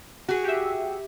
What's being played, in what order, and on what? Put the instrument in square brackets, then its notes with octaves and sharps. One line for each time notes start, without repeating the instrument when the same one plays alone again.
[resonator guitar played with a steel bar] F#4 G#4
[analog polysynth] G4 E5